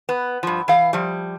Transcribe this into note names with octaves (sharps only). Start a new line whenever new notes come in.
B3
G2 F3
E3 F5
F3 G3